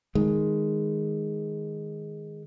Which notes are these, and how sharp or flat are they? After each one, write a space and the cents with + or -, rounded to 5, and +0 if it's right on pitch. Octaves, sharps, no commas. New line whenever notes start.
D#3 +0 G#3 +0